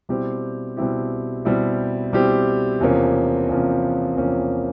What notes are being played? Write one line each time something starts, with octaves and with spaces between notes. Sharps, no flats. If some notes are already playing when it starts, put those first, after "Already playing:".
B2 G3 C4 E4 G4
B2 G3 C4 E4 G4
B2 G3 C4 E4 G4
B2 G3 C4 E4 G4
E2 C3 F3 A#3 C#4
E2 C3 F3 A#3 C#4
E2 C3 F3 A#3 C#4